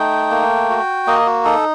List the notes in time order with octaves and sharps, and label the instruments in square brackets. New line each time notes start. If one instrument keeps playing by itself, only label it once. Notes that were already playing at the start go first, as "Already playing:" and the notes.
Already playing: [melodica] A3 D#4 G5
A#3
F#4
A#3 D#5
F#4
D#4 A4